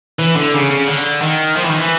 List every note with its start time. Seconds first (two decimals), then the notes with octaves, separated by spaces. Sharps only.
0.19 E3
0.36 D3
0.54 C#3
0.71 C#3
0.88 D3
1.22 D#3
1.57 F3
1.64 E3
1.71 D#3
1.79 E3